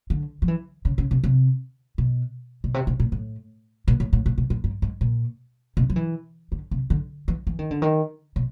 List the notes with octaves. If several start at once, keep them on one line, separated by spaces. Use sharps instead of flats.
D3
F3
E3
C#3
C#3
C3
C3
B2
B2
C3
B2
A#2
A2
A#2
A2
A2
A#2
B2
A#2
G#2
G#2
A#2
B2
F3
E3
D3
C3
D3
E3
E3
D#3
D3
D#3
B2